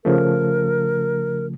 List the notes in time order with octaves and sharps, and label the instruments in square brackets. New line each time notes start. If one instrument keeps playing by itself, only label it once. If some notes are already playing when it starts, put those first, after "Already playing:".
[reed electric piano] C#3 F3 A3 [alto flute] A#4